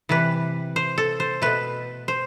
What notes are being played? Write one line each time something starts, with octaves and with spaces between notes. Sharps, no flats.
C3 E3 G3 B4
C5
A4
C5
B2 A3 B4
C5